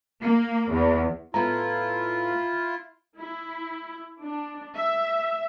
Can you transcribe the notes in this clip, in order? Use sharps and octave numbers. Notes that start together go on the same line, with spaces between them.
A#3
E2
A2 B3 E4 F4 A#5
E4
D4
E5